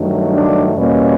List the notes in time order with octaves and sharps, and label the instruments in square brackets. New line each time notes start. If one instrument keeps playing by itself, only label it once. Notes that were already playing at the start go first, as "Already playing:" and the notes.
Already playing: [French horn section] G2 D#3 F#3 A3
D4
E2 B2 G3 A#3 C#4